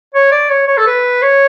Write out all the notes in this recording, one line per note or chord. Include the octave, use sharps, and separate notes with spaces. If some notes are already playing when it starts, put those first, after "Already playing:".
C#5
D5
C#5
C#5
A4
B4
C#5